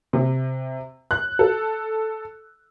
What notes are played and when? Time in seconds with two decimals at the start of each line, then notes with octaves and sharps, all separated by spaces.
0.13 C3
1.11 F#6
1.39 A4